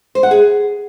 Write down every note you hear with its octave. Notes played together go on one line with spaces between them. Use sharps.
C5
F#5
G#4